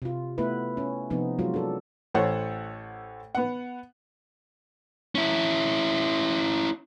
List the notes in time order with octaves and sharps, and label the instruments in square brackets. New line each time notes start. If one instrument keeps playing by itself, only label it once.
[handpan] C3 F4
A3 B3 E4 B4
C#4
C3 F3 B3 C4 D#4
F#3 G#3 F4 F#4
D4 A4
[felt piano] A1 A4 C5 C#5 F#5
B3 F#5
[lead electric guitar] C#4 E4